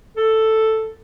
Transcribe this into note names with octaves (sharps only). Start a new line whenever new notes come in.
A4